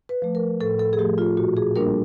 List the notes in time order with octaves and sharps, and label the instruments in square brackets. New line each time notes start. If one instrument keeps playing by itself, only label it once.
[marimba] B4
F3 A3
A#4
A2 A4
A4
G#4
F3 A3 G4
F4
A#2 F#4
G#4
G3 A#3 D4 A#4